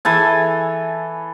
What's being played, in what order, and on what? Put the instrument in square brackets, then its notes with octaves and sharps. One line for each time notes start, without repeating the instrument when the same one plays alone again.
[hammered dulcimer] E3 A4 G#5